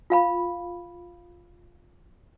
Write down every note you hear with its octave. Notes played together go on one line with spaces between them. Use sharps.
F4 F5 B5